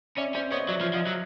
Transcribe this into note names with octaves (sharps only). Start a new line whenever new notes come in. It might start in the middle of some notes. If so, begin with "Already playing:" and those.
C#4 D5 E5
C#4 C5 D5
B3 C#5 D#5
F#3 D5 E5
F3
F3 D#5 F5
F#3